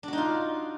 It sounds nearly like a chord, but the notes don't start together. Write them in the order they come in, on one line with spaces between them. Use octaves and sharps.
D4 F#4 D#4 F4